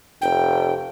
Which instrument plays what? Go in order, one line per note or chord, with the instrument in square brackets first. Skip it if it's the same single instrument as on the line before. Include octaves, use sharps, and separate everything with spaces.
[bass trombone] F1 [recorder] G5